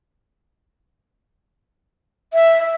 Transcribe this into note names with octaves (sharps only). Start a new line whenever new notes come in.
E5